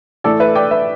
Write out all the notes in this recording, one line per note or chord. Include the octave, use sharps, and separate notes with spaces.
A2 E3 A3 A4 D5
B4 E5
D5 G5
B4 E5